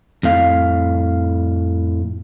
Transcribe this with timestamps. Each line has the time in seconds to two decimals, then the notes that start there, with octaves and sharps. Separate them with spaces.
0.23 F2 A2 F5